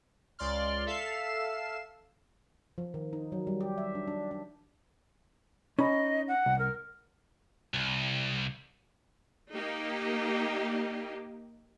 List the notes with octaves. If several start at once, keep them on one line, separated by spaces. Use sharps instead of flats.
C#2 D5 C6 F6
A4 E5 F5 C7 E7
F3
D#3
D#4
F#3
G3
G4
E5
D4
D4
D4
C#4 D#4 D#5 B5
F#5
C2
A#4
C2
A#3 D#4 G4